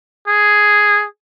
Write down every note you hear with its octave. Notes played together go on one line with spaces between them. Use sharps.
G#4